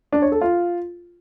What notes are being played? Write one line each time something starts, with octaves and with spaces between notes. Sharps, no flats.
D4
C#5
A4
F4